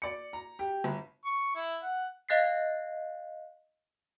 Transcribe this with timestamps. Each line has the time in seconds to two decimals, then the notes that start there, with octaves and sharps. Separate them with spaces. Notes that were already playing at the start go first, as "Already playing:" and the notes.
0.02 D5 C#7
0.33 A#5
0.59 G4
0.84 G1
1.25 C#6
1.55 E4
1.83 F#5
2.29 D#5 F5 F#6 A6 B6 C7